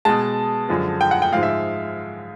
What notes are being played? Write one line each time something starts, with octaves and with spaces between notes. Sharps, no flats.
B2 G#3 A5
F#2 D3 F3 G#3
G5
F#5
G5
G#2 F3 G#3 F5
E5